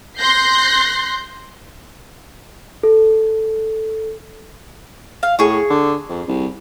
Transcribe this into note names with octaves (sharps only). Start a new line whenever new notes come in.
C6 F#6 G6 A#6 C7
A4
F5
A2 G#4 C#6
D3
F2
C2